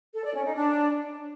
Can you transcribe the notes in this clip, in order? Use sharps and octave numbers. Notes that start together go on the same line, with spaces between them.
A4
D5
C#4
D#4
D4